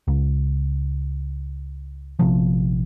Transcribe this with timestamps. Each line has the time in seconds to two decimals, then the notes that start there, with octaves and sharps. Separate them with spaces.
0.08 C#2
2.19 A#1 C3 F3